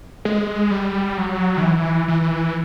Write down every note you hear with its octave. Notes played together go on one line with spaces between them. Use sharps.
G#3
G3
F#3
D#3
E3
E3